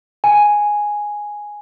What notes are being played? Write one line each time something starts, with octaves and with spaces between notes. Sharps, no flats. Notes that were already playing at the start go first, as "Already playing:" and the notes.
G#5